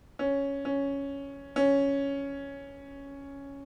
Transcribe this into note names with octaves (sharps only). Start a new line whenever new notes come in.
C#4
C#4
C#4